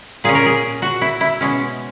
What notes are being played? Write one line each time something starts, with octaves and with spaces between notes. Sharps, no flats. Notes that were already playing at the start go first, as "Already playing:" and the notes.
A#2 A#3 C#4 G#4
A#4
G#4
F#4
E4
E4
B2 G#3 C#4